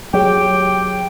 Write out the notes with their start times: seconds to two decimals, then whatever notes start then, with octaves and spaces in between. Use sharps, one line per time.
0.14 F#3 G4 G#4 G5